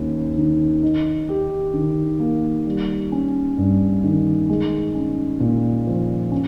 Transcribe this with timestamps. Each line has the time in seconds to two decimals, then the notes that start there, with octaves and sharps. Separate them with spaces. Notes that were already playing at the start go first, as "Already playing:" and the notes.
Already playing: D#2 C#4
0.37 D#3
0.83 D#4
1.29 G4
1.74 D#3
2.20 A#3
2.66 G3
3.12 C#4
3.58 G2
4.04 D#3
4.49 G#3
4.95 C#4
5.40 A#2
5.87 F3
6.32 C#4